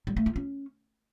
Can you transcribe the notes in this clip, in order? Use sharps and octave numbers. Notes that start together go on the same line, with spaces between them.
G3
A3
F4
C#4